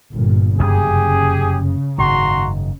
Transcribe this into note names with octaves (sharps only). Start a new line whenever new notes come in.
G1 A#2
F1 F#2 C#3 A#3 G4 G#4
F#1 G#2 D#3 F#4 A#5 C6